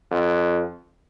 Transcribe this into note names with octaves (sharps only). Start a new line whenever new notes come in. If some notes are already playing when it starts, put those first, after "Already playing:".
F2